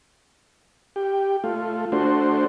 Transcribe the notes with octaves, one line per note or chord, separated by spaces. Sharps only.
G4
A3 F4
A3 D4 F#4 C5